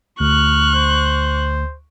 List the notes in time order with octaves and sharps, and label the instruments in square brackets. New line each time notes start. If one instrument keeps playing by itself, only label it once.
[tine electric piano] D2 [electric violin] C#6 F#6 [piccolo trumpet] F6
[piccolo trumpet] C5